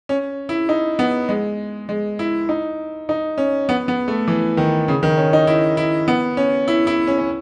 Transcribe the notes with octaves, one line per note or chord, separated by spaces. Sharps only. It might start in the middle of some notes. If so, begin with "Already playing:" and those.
C#4
E4
D#4
B3
G#3
G#3
E4
D#4
D#4
C#4
B3
B3
A3
E3
D#3
C#3
D#3
C#4
D#4
E4
E4
B3
C#4
E4
E4
C#4
C#4